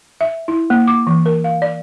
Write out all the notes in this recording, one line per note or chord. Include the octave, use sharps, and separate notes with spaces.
E5
E4
A#3
D6
E3
A#4
F5
D5